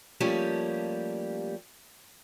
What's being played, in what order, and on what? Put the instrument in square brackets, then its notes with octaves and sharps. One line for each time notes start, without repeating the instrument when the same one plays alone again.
[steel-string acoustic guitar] F3 G3 A3 A#3 C#4 G4